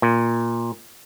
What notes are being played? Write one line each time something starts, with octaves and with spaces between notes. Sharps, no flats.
A#2